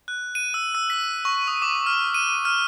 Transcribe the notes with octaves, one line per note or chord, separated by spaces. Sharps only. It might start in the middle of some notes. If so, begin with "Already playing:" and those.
F#6
D#7
E6
E6
B6
C#6
D#6
D6
F6
D#7
F6